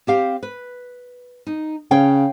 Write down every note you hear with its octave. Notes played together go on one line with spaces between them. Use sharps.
C4 G4 F5
B4
D#4
C#3 C#5 F5 G5